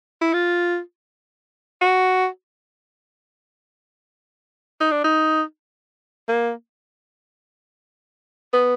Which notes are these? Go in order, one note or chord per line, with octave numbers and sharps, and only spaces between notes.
E4
F4
F#4
D#4
D4
D#4
A#3
B3